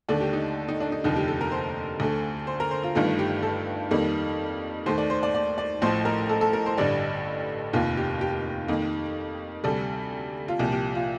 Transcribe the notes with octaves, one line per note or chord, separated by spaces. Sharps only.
D#2 D3 A3 D5
G4
D#4
D#4
D4
D#4
F1 D#2 D3 F3 D#4
G4
A4
A#4
C5
D2 D3 A3
C5
A#4
C5
F4
G1 G2 D#3 A3 F4
G4
A4
F2 D#3 G3 A#3
D#2 D#3 A3 C5
D5
C5
D5
D5
D5
A1 A2 F3 A3 C5
A#4
A4
A4
A#4
C5
A1 G2 D3 G3 D5
F1 D#2 D#3 A#3 F4
G4
G4
F2 D#3 A#3
D2 C3 G3 A4
F4
C2 A#2 F3 G4
G4
F4